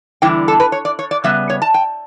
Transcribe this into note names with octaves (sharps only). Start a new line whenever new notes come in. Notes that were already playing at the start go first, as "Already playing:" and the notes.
E2 D3 G3 E4 G5
A4
B4
C#5
D5
C#5
D5
C#3 G3 B3 E5
C#5
A5
G5